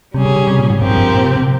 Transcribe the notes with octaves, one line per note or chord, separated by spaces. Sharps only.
C3 G3 C#4 G#4
C#3
C#3
C3
A#2
G#2
G2 F3 C4 G4 A#4
G#2
G2
A#2
C3
C3